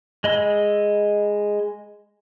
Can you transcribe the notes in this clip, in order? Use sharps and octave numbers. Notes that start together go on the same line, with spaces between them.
G#3 D#5 B5 E6